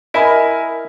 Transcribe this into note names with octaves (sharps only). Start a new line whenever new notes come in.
E4 A#4 D#5 E5 G#5 B5